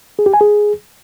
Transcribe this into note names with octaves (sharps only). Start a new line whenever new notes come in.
G#4
G4
G#5
G#4